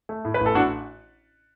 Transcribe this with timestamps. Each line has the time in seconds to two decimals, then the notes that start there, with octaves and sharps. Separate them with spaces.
0.09 A3
0.25 A2
0.34 B4
0.41 A1
0.46 A4
0.55 A2 D4 F#4